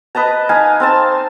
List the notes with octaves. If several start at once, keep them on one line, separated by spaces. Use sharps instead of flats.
B4 D#5 A5 A#5
D#4 F5 G#5
C4 F5 A5